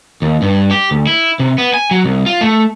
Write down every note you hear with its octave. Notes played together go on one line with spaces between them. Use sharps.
D#2
G2
G4
D2
E4
C3
B3
G#5
F#3
C2
F4
A3